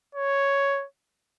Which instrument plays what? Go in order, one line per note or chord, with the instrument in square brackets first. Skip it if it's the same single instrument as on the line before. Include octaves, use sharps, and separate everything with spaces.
[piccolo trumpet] C#5